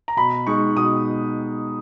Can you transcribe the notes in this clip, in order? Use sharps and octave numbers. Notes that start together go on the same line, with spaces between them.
A#5
B2 B5
G#3 D#4 C#6
B2 D#6